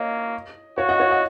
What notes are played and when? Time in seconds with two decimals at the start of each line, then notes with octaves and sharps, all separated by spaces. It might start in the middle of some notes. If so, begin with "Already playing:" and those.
Already playing: A#3 C#5 D#5
0.78 F#4 C#5 F5
0.89 D#5 F#5
1.00 C#5 F5
1.11 D#5 F#5